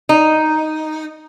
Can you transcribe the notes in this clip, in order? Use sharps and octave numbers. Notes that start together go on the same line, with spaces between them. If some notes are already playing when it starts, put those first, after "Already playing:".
D#4